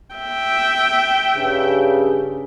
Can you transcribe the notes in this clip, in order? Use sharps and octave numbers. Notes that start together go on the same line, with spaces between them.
E5 G5
G2 C#3